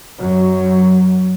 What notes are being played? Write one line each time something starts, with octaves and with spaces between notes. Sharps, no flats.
F#2 F#3